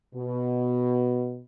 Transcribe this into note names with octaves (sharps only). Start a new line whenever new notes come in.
B2